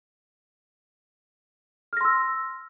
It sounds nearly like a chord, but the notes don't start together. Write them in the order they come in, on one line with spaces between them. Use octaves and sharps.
F6 A#6 C6 E6